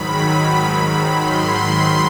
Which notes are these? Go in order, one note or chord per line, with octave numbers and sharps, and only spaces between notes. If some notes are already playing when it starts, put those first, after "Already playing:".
Already playing: G#2 D#3 F#3 B5
B5
C6
C6